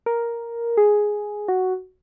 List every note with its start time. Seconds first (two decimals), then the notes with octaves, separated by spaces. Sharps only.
0.06 A#4
0.77 G#4
1.48 F#4